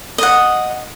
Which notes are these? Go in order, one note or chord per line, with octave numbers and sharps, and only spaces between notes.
D#5 F#5